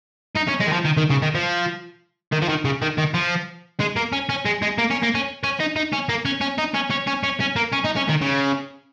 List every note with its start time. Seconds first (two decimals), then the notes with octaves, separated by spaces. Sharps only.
0.36 D#4
0.49 C#4
0.61 G#3
0.67 D#3
0.73 F3
0.85 D#3
0.97 D#3
1.10 C#3
1.22 D#3
1.35 F3
2.33 D#3
2.42 F3
2.49 D#3
2.65 C#3
2.82 D#3
2.98 D#3
3.14 F3
3.80 G#3
3.96 A#3
4.12 C#4
4.29 C#4
4.45 G#3
4.62 G#3
4.78 A#3
4.90 C#4
5.03 A#3
5.15 C#4
5.44 C#4
5.60 D#4
5.76 D#4
5.92 C#4
6.09 A#3
6.25 C#4
6.41 C#4
6.58 D#4
6.75 C#4
6.91 C#4
7.07 C#4
7.24 C#4
7.40 C#4
7.56 A#3
7.73 C#4
7.85 D#4
7.97 C#4
8.09 D#3
8.22 C#3